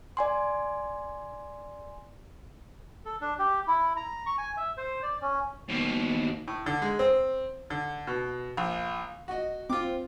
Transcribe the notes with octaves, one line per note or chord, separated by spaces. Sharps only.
D5 G#5 C6
A4
D4
G4
E4
A#5
C#6
G#5
E5
C5
D5
C#4
D#2 B2
A2
D3
G#3
C4
D3
B2
A#1
F#4 D#5
C4 F4 D6